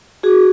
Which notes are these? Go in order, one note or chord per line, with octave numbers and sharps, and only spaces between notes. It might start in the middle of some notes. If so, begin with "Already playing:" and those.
F#4 G#4